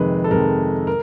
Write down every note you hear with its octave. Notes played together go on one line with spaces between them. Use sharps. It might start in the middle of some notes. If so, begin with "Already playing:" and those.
Already playing: F2 C3 D#3 G#3 B4
A4
F2 C3 D#3 G#3 A#4
A#4